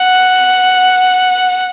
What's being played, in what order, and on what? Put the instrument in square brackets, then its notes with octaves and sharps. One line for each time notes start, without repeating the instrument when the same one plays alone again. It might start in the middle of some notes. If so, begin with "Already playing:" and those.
Already playing: [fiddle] F#5